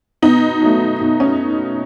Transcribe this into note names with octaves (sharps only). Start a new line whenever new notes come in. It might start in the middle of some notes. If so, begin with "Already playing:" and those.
B2 B3 D#4
F#3 A3
B2
C#4